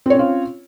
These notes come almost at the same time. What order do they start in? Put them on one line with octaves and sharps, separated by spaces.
C4 C#5 C#4 F4